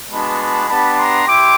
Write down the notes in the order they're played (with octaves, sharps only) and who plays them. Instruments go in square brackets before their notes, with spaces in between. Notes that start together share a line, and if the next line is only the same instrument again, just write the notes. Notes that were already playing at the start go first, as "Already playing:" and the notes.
[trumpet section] G#3 B3 D4 F#4 A5 B5
A5 B5
B3 D4 G4 A5 B5
A#5 C6
E4 G4 C6 D6